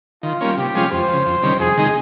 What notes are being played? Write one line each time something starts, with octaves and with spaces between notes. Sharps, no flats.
D#3 F4
G3 A#3 C#4
C3 G4
F3 G#3 C#4 F4
F2 C5
C#3 F3
F2
C3 D#3 G3 C#4
F2 G#4
C3 D#3 G#3 D#4